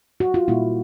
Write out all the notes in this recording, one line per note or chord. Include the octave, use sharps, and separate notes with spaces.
F#4
F4
A#2 G3 A#3 E4